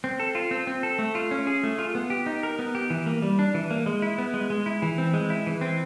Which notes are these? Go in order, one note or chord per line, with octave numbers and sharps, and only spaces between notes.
C4
A4
F4
C4
C4
A4
A3
F4
C#4
G#4
A3
F4
B3
G4
D#4
A#4
B3
G4
E3
A#3
G3
D4
E3
A#3
G#3
E4
B3
G#3
G#3
E4
E3
C4
G#3
E4
E3
C4